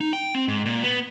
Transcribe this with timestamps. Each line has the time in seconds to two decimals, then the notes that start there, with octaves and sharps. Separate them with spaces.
0.01 D#4
0.13 G5
0.35 C4
0.48 G#2
0.66 A#2
0.83 B3